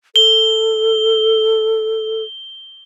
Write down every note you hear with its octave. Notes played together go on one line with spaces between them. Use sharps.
A4 G7